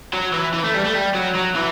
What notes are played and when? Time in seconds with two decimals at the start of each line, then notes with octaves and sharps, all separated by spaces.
0.13 F#3
0.33 E3
0.54 E3
0.64 A3
0.74 G3
0.84 A3
0.94 G3
1.15 F#3
1.35 F#3
1.55 E3